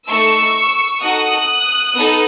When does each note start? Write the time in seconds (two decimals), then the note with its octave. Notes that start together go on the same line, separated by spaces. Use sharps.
0.09 A3 D#4 A4 C#6 E6
1.02 D#4 F#4 A4 D#6 F#6
1.95 B3 D#4 A4